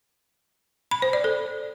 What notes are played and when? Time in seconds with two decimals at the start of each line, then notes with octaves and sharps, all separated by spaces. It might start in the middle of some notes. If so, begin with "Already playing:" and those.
0.91 B5
1.02 C5
1.13 D5
1.24 A4